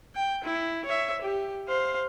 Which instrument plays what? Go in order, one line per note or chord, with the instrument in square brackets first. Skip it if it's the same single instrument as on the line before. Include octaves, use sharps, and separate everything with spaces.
[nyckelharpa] G5
E4
C#5 E5
G4
C5 F5